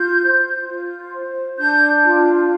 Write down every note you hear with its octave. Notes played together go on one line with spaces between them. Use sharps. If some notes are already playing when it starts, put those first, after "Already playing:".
Already playing: F4 G6
C5
F4
C5
D4 G6
F4